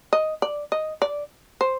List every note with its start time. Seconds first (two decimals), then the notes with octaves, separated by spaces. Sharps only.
0.13 D#5
0.42 D5
0.72 D#5
1.02 D5
1.61 C5